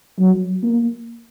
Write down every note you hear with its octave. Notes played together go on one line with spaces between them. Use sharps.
F#3
A#3